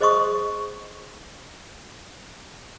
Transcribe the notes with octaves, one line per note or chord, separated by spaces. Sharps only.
G#4 C5 D#5 C6 C#6 D#6